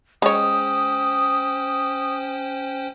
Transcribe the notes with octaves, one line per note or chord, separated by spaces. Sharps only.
G#3 C#4 C5 C#5 G5 D#6